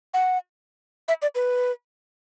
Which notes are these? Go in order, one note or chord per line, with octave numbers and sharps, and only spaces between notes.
F#5
E5
D5
B4